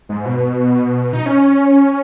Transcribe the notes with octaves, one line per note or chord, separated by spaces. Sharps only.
G#2
B2
D#4
C#4